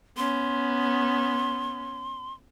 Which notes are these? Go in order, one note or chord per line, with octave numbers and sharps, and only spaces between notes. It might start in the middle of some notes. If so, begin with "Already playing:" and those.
B3 C#4 C6